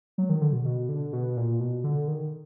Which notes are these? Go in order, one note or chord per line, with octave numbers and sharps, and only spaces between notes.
F#3
D#3
D3
B2
B2
D3
B2
A#2
B2
D3
D#3